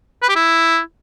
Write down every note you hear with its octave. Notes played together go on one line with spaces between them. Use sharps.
B4
G4
E4